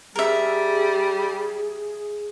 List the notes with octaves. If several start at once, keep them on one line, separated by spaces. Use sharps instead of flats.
G3 G#4 A#4 E5